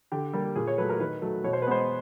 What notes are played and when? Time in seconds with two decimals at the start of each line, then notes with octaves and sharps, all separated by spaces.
0.12 D3 G4
0.33 G3 A#3
0.56 A#2 G#4
0.67 C#5
0.78 F#3 A3 B4
0.90 A#4
1.00 D#3 B4
1.22 F#3 A3
1.44 B2 C#5
1.53 C5
1.62 B4
1.67 G#3 B3 C5